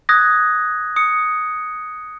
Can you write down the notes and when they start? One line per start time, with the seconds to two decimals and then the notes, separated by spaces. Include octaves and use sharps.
0.09 D#6 F#6 G#6 A#6
0.96 D#6 C#7